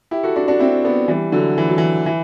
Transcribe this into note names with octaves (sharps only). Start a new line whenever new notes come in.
E4 G4
F#4 A4
D4 F#4
D4 F#4
C4 E4
B3 D4
E3 G3
D3 F#3
E3
F#3
E3
E3